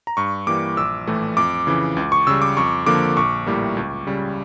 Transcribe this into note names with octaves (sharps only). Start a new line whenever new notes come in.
A#5
G2 C#6
E3 G3 A#3 D6
A#1 E6
A2 E3 A3
F2 D6
C#3 E3
C#2
C#6
C#3 G3 E6
D6
F2 C#6
D3 F3 A#3 D6
A#1 C#6
A2 G3 A#3
C#2
C#3 G3